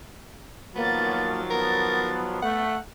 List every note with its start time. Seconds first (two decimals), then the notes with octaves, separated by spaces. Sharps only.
0.75 D#3 F3 F#3 A#3 B3 A6
1.50 B3 A#4
2.42 A3 F#5